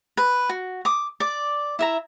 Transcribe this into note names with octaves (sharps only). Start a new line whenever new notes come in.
B4
F#4
D6 D#6
D5 D6
E4 E5 A#5